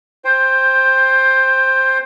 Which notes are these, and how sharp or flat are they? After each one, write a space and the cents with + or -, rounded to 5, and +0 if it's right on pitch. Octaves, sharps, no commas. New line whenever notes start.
C5 +10 G5 +20